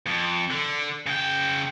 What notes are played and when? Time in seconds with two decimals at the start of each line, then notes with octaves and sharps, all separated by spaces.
0.06 F2
0.50 D3
1.06 C#3 G5